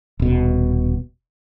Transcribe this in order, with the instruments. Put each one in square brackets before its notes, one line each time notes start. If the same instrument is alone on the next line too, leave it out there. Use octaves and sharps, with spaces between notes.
[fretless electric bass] D#1 B2